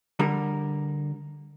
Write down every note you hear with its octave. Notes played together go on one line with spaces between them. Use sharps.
D3 G3 A#4